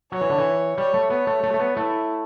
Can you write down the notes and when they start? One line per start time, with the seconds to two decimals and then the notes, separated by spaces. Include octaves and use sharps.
0.12 F#3 C#5
0.21 E3
0.30 D3
0.38 E3
0.77 G3 C#5
0.94 A3
1.10 B3 C#5
1.27 A3
1.43 A3
1.54 A3
1.60 B3
1.77 A3 E4